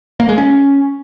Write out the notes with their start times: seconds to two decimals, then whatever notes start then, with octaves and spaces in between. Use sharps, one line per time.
0.20 A#3
0.29 G#3
0.38 C#4